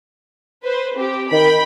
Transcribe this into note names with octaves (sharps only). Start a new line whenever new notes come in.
B4 C5
C4 G4
D#3 G5 B5